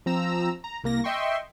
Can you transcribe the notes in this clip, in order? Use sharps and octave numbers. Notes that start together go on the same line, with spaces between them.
F3 C4 A#5 E6
A#5
C2 A#3 A#6
D#5 E5 G5 C6 C#6